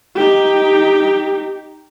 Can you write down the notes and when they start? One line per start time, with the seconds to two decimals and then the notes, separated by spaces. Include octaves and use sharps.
0.15 D#4 G4